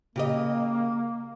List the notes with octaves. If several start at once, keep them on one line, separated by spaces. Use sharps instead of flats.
C#3 A#3 G4 D#5